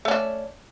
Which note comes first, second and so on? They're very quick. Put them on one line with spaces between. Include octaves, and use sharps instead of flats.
A3 C#4 D4